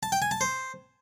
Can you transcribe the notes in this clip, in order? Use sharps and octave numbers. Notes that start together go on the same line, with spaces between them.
A5
G5
G#5
A5
C5